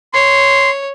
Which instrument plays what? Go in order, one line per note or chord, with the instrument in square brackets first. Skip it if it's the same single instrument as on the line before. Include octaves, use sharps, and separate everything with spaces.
[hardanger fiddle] C#5 [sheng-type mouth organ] C6